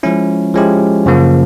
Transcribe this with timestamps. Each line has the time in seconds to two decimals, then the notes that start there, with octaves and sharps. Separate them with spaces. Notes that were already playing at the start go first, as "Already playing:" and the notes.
0.03 F3 G#3 C#4 E4
0.54 F3 G#3 C#4 E4 G4
1.06 F#2 C#3 F3 A#3